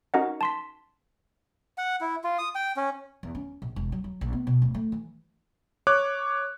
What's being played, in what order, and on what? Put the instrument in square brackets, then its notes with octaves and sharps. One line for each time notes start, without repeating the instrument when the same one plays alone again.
[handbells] C#4 D#4 F#4 A#4 D#5 F#5
A5 C6 B6
[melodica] F#5
E4
F4
D#6
G5
C#4
[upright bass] E2
C#4
A#1
E1
F#3
F#3
A#1
B3
B2
D1
A3
E3
[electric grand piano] C#5 D6 F#6